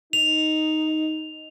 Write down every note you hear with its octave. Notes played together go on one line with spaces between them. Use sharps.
D#4 F7